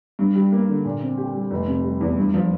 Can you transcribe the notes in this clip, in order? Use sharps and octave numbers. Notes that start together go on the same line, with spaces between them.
G2
G3
A#3
D3
A#2
C4
G4
G3
F1
C3
G3
E2
G2
F3